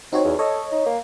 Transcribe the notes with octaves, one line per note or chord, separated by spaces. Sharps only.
C4 D#4 F#4 C#5
E2
A4 C#5 D#5
D#4
A#3